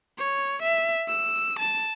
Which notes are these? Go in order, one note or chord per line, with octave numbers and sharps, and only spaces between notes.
C#5
E5
E6
A5